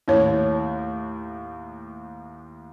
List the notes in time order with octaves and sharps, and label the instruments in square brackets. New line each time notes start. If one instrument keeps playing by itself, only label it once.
[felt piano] D#2 A2 [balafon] E4 C#5